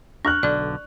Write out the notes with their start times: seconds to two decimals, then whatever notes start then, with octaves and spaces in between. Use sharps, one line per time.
0.25 D4 C#6 F6 F#6
0.43 B1 D3 D5